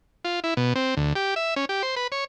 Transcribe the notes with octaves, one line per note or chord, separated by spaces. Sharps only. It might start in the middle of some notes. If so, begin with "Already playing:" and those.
F4
E4
B2
C4
D2
G4
E5
C#4
G4
C5
B4
C#5